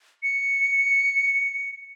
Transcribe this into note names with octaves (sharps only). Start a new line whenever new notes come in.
C#7